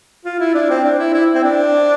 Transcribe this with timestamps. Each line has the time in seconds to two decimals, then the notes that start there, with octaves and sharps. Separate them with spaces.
0.25 F4
0.40 E4
0.54 D4
0.70 C4
0.84 D4
0.99 E4
1.14 E4
1.35 C4
1.44 D4